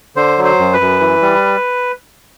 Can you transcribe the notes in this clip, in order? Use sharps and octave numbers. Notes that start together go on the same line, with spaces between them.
D3 C5
F#3
C5
F#2
B4
F#2
E3
G3